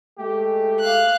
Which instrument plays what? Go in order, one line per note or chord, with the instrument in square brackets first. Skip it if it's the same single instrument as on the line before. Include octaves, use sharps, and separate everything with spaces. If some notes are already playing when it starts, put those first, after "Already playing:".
[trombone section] G#3 A3 [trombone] G4
[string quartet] F5 F#6